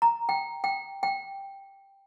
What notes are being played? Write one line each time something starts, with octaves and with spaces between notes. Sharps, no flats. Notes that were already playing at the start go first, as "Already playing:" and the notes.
A#5
G5
G5
G5